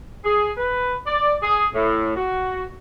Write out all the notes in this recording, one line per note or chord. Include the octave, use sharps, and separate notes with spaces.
G#4
B4
D5
G#4
A2
F#4